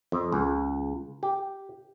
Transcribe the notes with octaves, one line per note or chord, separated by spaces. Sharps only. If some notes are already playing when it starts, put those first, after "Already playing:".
F2
C#2
G4